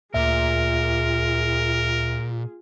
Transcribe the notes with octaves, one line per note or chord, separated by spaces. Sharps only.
D2 A#2 F4 G#4 A#4 E5